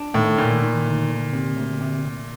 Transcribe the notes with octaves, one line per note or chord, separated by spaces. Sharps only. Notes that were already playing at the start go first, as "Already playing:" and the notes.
Already playing: D4
A2 D#3
A#2 D#3
D#3
D2
D2
C3
D2
C3